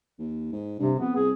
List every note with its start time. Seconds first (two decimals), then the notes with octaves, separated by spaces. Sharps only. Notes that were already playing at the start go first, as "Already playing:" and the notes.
0.19 D#2
0.52 G#2
0.79 G2 C3
0.99 F2 B3
1.15 C2 G#4